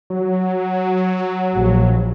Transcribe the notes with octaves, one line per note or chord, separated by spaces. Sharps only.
F#3
A#1